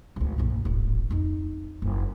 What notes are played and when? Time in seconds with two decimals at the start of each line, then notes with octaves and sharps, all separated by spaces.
0.16 G#1 D2
0.38 A#1 F#2
0.65 D1 G#1
1.10 F2 D#4
1.82 F#1